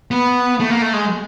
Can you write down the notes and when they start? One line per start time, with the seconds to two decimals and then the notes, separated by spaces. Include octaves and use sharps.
0.11 B3
0.60 A3
0.70 A#3
0.82 A3
0.93 G#3